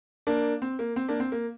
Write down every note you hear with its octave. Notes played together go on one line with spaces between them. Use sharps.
A#3 D4
C4
A#3
C4
A#3 D4
C4
A#3